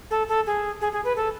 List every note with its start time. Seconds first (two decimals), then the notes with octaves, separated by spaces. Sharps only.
0.10 A4
0.28 A4
0.46 G#4
0.81 G#4
0.92 G#4
1.04 B4
1.16 A4